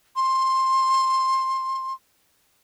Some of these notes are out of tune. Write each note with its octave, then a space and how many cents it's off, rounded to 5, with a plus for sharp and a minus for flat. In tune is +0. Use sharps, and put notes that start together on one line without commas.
C6 +15